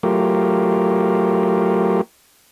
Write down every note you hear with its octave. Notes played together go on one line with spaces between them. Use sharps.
F#3 A3 F4 G4 A#4